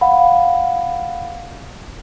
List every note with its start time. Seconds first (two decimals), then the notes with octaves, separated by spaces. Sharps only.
0.01 F5 F#5 B5